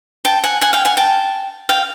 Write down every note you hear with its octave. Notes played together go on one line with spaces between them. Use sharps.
G5 A5
F#5 G#5
F#5 G#5
F5 G5
F#5 G#5
G5 A5
F5 G5